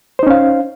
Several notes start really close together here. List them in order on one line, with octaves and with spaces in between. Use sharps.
C5 D#4 C#4 F5